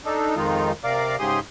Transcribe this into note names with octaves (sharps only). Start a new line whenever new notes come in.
D4 D#4 A4
F2 D#3 G#3 D#4 F4
C3 A#4 D5 F5 D6
G#2 C#3 G4 G#4 C6 D#6